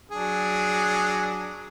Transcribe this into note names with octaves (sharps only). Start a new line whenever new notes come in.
F#3 D4 G#4